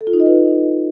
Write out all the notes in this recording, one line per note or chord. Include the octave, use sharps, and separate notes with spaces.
A4
F4
D#4
D#5
B4